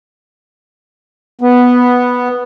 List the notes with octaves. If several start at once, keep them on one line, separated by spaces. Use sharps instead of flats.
B3